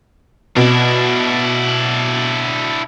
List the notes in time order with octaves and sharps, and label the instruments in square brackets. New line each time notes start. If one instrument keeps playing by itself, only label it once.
[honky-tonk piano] B2 [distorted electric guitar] D4 E4